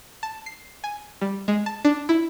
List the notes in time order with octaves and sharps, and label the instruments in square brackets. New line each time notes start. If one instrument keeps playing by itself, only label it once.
[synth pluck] A5
C7
G#5
G3
G#3
A5
D4
E4